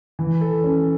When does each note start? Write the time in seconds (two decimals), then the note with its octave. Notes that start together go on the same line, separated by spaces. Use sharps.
0.19 E3
0.41 A4
0.64 C#4